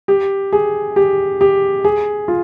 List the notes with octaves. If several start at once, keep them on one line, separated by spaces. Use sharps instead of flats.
G4
G#4
G4
G4
G#4
F4